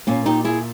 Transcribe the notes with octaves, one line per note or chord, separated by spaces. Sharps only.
A#2 A#3 C#4
D#4 G4
E4 G#4